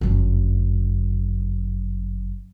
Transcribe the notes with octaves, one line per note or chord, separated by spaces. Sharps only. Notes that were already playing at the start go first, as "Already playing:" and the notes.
G1 F#2